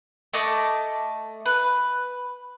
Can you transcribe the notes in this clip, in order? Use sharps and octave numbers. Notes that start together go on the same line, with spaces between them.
A3 D#5 A5 D6
B4